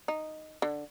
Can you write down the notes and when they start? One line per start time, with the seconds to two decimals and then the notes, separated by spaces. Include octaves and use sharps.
0.08 D#4
0.62 D3